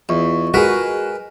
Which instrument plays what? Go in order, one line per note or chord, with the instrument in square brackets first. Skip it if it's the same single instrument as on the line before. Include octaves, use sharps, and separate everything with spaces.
[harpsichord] E2 [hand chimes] F4 D#5 C#6
[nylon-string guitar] G#3 G#4 [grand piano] F#4 [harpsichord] A#4 B4